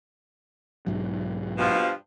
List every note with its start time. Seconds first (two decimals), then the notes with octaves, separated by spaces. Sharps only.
0.87 B1 G#2 F#3
1.58 G2 B2 F3